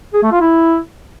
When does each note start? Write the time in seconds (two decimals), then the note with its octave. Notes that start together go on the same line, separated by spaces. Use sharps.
0.14 G#4
0.23 A3
0.32 F4
0.40 E4